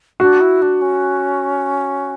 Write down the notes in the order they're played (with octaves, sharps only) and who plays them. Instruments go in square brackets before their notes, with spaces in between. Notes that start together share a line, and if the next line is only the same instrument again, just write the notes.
[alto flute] D4 [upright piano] F#4
[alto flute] E4
D4
C#4